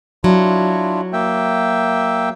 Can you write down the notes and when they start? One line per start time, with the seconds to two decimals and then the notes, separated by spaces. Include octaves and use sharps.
0.24 F#3 D4 E4 F4
1.13 A#3 E5 G5